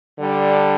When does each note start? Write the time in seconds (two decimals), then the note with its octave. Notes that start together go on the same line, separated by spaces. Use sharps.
0.19 D3 G3 D4